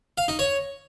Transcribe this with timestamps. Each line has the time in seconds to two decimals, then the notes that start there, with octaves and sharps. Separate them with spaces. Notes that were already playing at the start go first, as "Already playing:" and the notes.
0.18 F5
0.28 D#4
0.39 C#5